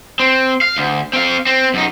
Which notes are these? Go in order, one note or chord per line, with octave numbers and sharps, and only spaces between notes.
C4
F5
D2
C4 F5
C4
F#2 D#4